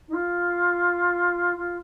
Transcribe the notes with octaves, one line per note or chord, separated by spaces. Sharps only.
D#4
F4
F4